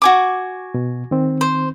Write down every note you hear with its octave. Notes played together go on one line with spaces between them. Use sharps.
F#4 G#5 D6
B2
D#3 C4
C5